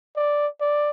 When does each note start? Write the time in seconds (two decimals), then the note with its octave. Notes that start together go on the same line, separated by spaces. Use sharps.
0.17 D5
0.61 D5